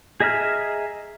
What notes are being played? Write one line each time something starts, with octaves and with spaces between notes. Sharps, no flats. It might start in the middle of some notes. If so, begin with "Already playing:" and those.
G#4 D#5 E5 A#5 F6